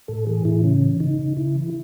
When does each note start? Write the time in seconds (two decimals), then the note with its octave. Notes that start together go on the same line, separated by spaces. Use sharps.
0.08 A2 A4
0.27 E3 G#4
0.45 A2 E4
0.64 C#3 C#4
0.82 E3
1.00 C#3 D#4
1.19 C#3
1.37 C#3 E4
1.55 E3